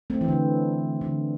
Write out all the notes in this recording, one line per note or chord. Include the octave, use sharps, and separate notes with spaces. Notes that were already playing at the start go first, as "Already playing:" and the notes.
A3 C4
E3
D3
D3